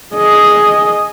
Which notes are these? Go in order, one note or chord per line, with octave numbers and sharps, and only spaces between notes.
G#4 D#5